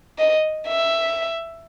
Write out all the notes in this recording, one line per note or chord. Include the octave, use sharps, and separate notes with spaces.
D#5
E5